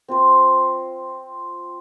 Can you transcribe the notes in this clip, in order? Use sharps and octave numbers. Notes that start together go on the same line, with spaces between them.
C4 F4 C5